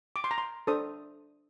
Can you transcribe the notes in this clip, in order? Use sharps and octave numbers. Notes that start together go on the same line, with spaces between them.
D6
C6
A#5
C6
D4 A4 C5 D#6